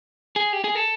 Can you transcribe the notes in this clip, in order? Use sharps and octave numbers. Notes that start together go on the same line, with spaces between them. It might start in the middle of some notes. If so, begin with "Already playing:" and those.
G#4
G4
G#4
A4